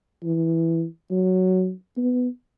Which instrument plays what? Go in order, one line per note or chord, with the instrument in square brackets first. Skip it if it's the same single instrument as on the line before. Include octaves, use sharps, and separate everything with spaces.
[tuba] E3
F#3
B3